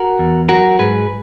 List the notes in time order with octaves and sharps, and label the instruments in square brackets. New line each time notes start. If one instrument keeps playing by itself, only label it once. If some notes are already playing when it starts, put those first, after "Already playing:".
Already playing: [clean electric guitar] F#4 A#4
E2
F#3 F#4 A#4
G#2 G#4 B4